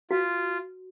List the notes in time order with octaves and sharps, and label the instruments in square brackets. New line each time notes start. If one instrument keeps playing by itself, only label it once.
[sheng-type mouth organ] F4 [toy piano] F#4